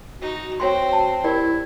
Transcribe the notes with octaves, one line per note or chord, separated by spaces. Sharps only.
D#4 F#4
C4 F#4 C#5 G5 C6
A5
E4 G4 A#4 D5